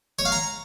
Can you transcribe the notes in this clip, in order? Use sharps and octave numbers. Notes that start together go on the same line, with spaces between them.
C#5
F5
A#5